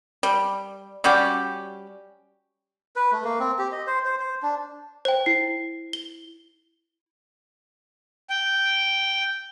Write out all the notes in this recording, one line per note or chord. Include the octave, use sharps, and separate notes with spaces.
G3
G3 C#4 F#4 G4
B4
A3
A#3
C4
G4
D#5
C5
C5
C5
D4
C5 G5
E4 C7
G7
G5